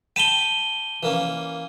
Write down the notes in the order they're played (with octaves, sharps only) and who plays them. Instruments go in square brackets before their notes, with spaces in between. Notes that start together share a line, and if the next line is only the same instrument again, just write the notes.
[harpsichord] G5 A5 B5 [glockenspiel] D#7 G7
[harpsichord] E3 A#3 C#4